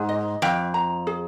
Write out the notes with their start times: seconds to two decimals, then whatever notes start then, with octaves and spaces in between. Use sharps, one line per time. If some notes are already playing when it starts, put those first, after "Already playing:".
Already playing: G#2 G#4
0.09 D#5
0.42 F2 G5
0.74 A#5
1.07 G#4